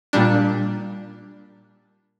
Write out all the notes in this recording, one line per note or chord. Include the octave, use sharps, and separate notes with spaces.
A#2 G3 D4